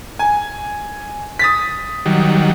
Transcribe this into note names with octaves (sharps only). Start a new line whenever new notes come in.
G#5
D#6 A6 B6
D#3 F#3 G3